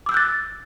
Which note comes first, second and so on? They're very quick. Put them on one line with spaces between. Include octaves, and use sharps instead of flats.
D6 E6 G6 F#6 A6